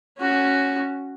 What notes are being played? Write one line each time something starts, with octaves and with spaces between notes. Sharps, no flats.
C#4 F#4